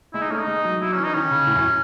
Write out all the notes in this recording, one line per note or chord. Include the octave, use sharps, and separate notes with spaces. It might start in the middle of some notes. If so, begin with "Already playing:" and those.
G#3 E4
D#4
A3 C#4
D#4
G#3
F#3
F#3 E4
C#4
E3
D#4
D#3 C#4
C#3
A2
F#2